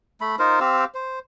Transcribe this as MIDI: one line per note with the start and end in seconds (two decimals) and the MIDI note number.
0.21 0.36 57
0.21 0.36 83
0.39 0.59 63
0.39 0.59 65
0.39 0.59 70
0.39 0.59 72
0.60 0.85 60
0.60 0.85 67
0.60 0.85 77
0.60 0.85 88
0.94 1.19 72